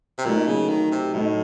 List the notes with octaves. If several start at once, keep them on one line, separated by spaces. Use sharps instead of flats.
C3
A#2 F#3 A3 D#4
C#3
D#3
C3
A2 F#3 A3 D#4